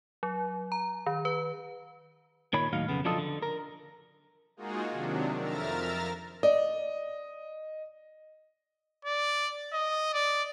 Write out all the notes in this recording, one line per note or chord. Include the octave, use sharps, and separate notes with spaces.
F#3
A#5
D#3
B4
A#2 D#3 C#5 B5
D#2 A2 F#3 D#4 F5
B1 F2 C#3 B3
F3 F#3 D4 F4 A4 D#5
D3
A#4
G#3 A#3 D#4 F4 F#4 G#4
C3 D#3 F#3 D4
F2 A#4 E5 A#5 F6 A6
D5 D#5
D5
D#5
D5